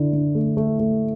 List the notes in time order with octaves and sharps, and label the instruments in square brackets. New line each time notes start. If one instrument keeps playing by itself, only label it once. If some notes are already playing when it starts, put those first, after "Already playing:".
Already playing: [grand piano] D3 E4
D3
A3
A3
A3